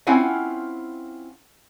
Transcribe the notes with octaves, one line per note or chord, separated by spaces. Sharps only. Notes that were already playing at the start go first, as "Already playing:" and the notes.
C4 C#4 E4 F4 F#5 G#5